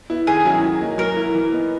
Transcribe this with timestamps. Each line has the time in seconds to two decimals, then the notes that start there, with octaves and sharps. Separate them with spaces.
0.10 B3 E4
0.27 D#3 G#4
0.45 F#3 C#4 E4
0.63 F#3
0.81 A#3 D#4
0.98 F#3 A#4
1.17 A#3 E4
1.35 E3
1.52 B3 D#4